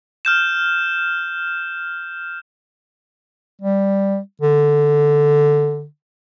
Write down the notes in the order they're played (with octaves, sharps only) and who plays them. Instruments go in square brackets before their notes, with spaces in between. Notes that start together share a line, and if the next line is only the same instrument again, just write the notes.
[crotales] F6 G6 E7
[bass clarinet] G3
D3